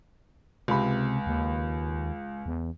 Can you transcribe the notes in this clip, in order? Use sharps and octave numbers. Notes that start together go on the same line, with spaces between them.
C#2 C3 B5
D#2
E2